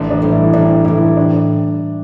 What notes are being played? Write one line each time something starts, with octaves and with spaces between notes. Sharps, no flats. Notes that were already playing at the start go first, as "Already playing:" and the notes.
Already playing: A1 D4
D4
A2 G3
E4
A1 D4
A2 G3 E4
D4